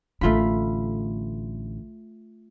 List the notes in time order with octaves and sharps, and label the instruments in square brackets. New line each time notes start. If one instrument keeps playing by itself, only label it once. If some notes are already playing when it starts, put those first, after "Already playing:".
[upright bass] A1 D3 [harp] A3 F4 B5